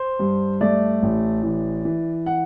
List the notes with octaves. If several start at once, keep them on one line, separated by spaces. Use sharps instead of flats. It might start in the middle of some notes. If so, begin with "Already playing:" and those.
Already playing: C5
G2
A3 D5
A1
E3
E3
F#5